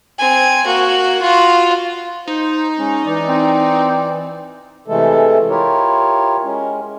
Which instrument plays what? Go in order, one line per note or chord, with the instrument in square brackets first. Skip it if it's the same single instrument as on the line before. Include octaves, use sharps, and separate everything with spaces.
[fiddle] C4 G#5
A#3 F#4
F4 F#4
[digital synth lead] D#4 [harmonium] C5
[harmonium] G#3 C#4
E3 D5
[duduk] C4
[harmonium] C3 E3 G#3 A3 A4
E4 F4 G4 A#4 C#5
G#3 C#4